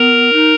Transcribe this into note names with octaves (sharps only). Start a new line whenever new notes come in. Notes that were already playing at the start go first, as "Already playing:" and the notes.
Already playing: B3 A#4 A#5
D#4